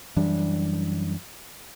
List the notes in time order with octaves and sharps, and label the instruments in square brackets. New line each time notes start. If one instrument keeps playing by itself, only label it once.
[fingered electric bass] F#2 E3 G3 D4